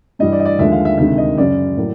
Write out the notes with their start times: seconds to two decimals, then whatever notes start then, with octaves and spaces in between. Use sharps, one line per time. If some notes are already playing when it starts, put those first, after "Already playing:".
0.19 G2 E3 G3 D#5
0.33 D5
0.40 D#5
0.45 D5
0.59 D#2 D3 F3 G#3 E5
0.72 F5
0.85 E5
0.98 D2 C3 D#3 G#3 E5
1.18 D#5
1.38 F#2 C#3 F#3 D5
1.77 A2 F#3 A#3